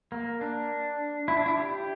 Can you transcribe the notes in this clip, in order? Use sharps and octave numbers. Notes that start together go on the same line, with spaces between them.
A#3
D4
E4
D4
E4
G4